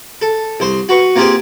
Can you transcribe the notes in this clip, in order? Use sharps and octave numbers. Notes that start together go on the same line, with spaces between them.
A4
C2 C5 C6
F#4 B4 C#6
A#3 C4 F4 G4 G#4 C5